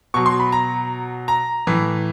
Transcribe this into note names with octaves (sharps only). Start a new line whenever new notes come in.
B2 F#3 C#6
C6
B5
A#5
A#5
A2 E3